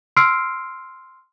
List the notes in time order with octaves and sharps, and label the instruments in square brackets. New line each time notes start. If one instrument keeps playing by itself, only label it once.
[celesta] C6 E6 F6 C7 D7